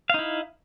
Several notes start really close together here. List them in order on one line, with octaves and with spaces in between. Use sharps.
F5 D#4 E4